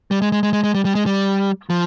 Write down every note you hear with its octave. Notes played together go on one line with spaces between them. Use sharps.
G3
G#3
G#3
G#3
G#3
G#3
G3
G3
G#3
G3
F3